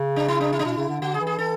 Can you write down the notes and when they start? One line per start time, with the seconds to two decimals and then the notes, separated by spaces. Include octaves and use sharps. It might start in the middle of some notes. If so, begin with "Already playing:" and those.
Already playing: C#3
0.16 D4
0.28 E4
0.41 D4
0.53 E4
0.59 D4
0.64 B2 E4
0.77 C#3
0.89 D3
1.01 D3 F#4
1.14 G#4
1.20 E3
1.27 G#4
1.39 E3 A4